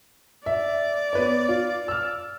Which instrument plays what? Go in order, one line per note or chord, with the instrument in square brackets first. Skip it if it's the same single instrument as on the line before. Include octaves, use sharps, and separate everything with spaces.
[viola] D5 [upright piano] E5
[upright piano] B3 B4 C#5
F4
E6 F6